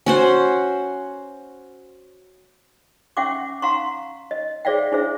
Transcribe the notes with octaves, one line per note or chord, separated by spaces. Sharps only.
C#4 F#4 C5
C#4 E5 F#5 G5 C#6 D6
F5 F#5 A#5 C6 C#6
D#5
G#4 C5 D5 E5 F5 G5
D4 E4 G#4 C5 E5